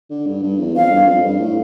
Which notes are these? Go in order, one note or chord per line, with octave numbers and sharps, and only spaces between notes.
D3
G2
G2
E2
F2 F5
G2
F2
G2
A2